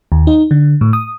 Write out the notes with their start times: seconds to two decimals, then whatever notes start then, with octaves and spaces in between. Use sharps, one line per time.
0.12 D#2
0.27 D#4
0.51 D3
0.81 A2
0.93 D#6